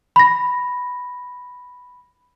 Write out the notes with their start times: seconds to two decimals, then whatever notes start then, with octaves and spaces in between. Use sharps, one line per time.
0.16 B5 A#6